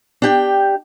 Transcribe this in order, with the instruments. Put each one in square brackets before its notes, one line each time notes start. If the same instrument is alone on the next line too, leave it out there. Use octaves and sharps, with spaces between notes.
[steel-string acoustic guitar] D4 G4 G5